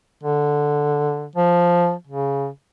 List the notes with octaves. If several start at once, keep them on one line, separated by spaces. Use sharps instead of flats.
D3
F3
C#3